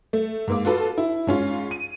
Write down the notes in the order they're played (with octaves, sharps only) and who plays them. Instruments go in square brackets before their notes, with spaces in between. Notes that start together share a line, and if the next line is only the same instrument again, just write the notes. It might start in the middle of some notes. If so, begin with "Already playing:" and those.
[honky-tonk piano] A3
G#2 A#3 D6
F4 F#4 A4 B4
E4
G#2 C#4 F4
D#7